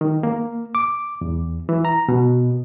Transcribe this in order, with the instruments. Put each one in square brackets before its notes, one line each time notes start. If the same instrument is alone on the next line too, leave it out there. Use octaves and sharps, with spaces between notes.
[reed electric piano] D#3
A#3
D6
E2
E3
A#5
B2